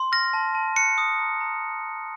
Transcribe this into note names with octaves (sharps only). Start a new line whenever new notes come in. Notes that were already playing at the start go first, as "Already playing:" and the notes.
Already playing: C6
F6 A#6
A5
A5
F#6 C#7
D#6
A#5
A#5